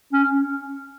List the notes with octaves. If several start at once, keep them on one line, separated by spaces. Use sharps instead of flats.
C#4